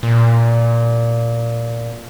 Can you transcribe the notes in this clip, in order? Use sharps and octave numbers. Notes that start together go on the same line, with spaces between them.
A#2